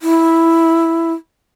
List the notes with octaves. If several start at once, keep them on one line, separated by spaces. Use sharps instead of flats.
E4